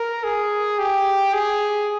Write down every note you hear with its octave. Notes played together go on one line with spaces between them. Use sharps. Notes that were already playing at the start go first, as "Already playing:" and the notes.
Already playing: A#4
G#4
G4
G#4